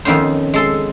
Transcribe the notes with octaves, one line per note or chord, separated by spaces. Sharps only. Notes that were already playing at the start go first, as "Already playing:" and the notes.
F2 D#3 B3 C#4 C5
G#3 A4 C6